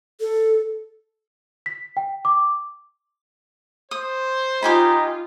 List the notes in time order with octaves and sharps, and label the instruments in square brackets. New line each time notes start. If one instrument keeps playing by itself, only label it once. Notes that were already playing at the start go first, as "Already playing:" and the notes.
[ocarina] A4
[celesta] B6
G5
D6
[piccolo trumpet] C5 [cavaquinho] D#6
[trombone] D#4 [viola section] F4 [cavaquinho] G4 G#5 B5